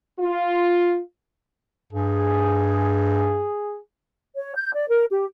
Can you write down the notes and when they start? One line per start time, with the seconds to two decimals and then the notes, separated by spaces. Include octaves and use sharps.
0.19 F4
1.93 G2 G#4
4.37 C#5
4.56 G6
4.74 D5
4.89 A#4
5.12 G4